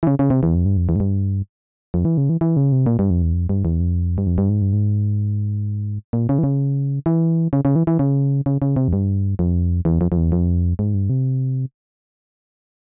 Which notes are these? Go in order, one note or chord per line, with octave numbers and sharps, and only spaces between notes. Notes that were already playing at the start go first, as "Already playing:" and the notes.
E3
C#3
C#3
C3
E2
F2
G2
F2
E2
G#2
G2
F2
E3
C#3
E3
E3
C#3
C3
A#2
G2
F2
E2
F2
G2
E2
F2
G2
F2
G2
G#2
G2
G#2
A#2
C#3
E3
C#3
E3
C#3
C#3
E3
E3
C#3
C#3
C#3
C3
F2
G2
F2
E2
F2
F2
E2
F2
G#2
G2
C3